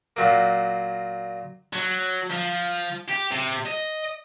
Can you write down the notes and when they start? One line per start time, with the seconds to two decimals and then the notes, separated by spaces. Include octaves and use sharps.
0.16 A#2 F#3 A#3
1.73 F#3
2.30 F3
3.09 G4
3.31 C3
3.66 D#5